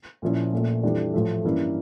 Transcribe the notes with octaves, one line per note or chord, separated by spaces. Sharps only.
A#1 A#2 F3 C#4 E4
A#1 A#2 A3
F2 E3 G3 D4
A1 A2 F3 A3
G2 E3 A#3 C#4 E4